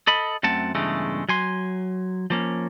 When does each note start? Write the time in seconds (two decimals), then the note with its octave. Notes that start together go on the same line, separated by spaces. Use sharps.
0.07 A4 D#5 B5
0.43 F#2 A3 C4 F#5 A5
0.75 E2 G2 C#3 E3 G#3 A3
1.29 F#3 G#5 C6
2.30 F3 A#3 C#4